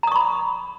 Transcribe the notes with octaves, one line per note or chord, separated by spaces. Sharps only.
A#5 B5 C#6 D#6